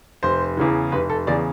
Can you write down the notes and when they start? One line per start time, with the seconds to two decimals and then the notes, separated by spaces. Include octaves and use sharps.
0.23 F1 C5
0.57 E2 C#3 E3
0.92 F1 B4
1.10 A4
1.27 E2 C#3 E3 D5